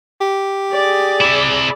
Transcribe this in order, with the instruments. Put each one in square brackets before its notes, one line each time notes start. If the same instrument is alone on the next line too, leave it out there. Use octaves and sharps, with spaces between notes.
[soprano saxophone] G4
[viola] G#4 D5
[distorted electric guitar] C3 E4